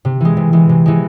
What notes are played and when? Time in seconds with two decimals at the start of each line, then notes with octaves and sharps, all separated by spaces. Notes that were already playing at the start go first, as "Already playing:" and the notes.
0.05 C3
0.20 E3 G#3
0.37 C3
0.53 E3 G#3
0.69 C3
0.86 E3 G#3